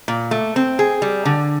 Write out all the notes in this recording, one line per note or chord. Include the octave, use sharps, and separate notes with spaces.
A#2
A3
C4
G#4
G3
D3